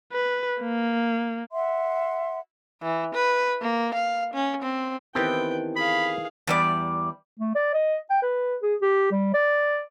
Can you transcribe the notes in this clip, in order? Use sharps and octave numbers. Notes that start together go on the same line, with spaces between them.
B4
A#3
E5 F#5 C6
E3
B4
A#3
F5
C#4
C4
D#3 E3 B3 C4 G4 A4 B4 G5
G#4 F5 B5
E2 G3 D5
A3
D5
D#5
G5
B4
G#4
G4
G3
D5